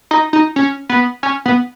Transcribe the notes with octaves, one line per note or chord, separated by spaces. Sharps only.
D#4
D#4
C#4
B3
C#4
B3